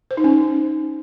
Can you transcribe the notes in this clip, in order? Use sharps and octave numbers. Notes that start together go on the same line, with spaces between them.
C5
D#4
C#4